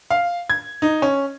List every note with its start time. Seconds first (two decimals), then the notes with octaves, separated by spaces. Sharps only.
0.10 F5
0.50 G#6
0.82 D#4
1.02 C#4